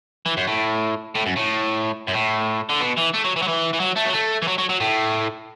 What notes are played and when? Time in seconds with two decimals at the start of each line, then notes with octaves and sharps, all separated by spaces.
0.26 E3
0.37 F#2
0.48 A2
1.15 A2
1.26 F#2
1.37 A2
2.08 F#2
2.14 A2
2.70 D3
2.81 B2
2.98 E3
3.14 A3
3.24 F#3
3.36 E3
3.42 F#3
3.47 E3
3.73 E3
3.80 F#3
3.96 A3
4.06 F#3
4.14 A3
4.42 E3
4.48 F#3
4.58 F#3
4.69 F#3
4.80 A2